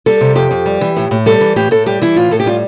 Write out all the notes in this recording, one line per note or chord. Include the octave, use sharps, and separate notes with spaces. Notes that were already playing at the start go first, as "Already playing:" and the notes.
G3 A4
C3
F2 G4
F2
G3
E3
A2
A2
G3 A4
E3
A2 G4
A2 A4
G3 G4
E3 E4
A2 F4
A2 A4
G4
G3 F4